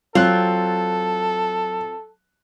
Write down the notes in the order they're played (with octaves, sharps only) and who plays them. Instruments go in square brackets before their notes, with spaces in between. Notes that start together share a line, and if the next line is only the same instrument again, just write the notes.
[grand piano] F#3 F#6 [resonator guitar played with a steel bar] C4 F4 [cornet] A4